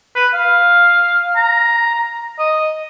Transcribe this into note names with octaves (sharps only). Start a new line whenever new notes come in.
B4
F5
A#5
D#5